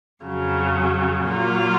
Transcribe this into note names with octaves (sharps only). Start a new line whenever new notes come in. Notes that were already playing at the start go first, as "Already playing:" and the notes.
F2 C#3 F#3
A#2 F#3 A#3 F4